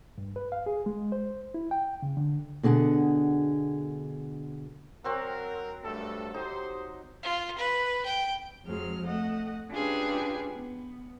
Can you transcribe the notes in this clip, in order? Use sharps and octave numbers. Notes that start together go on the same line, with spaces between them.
G2
B4
F5
G#4
G#3
C5
E4
G5
C#3
D3
B2 D3 G#4 F#5
F#3 C4 A#4 F#5
G2 A3 A4
D#4 G4 C5
F4
B4
G5
F2 F3 F#3 G#3 F6
A3 D#5 F#5
C#4 D4 F4 G4 G#4 B4
B3